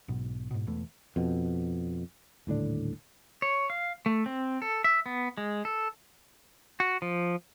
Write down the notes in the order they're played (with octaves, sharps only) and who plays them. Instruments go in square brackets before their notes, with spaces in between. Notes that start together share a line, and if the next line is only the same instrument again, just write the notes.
[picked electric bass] B1 G#2 B2
G#2 B2
E1 E2 E3 A3
[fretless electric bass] F2 B2
D#1 A2 D3 D4
[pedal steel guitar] C#5
F5
A3
C4
A4
E5
B3
G#3
A4
F#4
F3